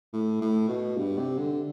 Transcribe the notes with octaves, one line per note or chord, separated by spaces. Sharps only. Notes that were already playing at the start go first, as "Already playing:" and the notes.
A2
A2
B2
G2
C3
D3